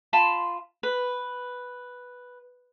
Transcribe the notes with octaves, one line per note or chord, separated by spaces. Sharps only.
F4 A5 B5 C6
B4